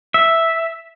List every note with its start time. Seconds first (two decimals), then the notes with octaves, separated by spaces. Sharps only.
0.14 E5